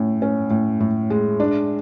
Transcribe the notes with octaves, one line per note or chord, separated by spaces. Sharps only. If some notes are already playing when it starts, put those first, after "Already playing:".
Already playing: A2 C#4
C#4
A2
A2
G#3
D4